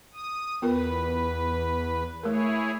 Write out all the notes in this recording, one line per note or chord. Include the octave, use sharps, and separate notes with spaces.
D#6
E2 B3 F4 A#4 B4
A3 E4 G#4 A#4 C#5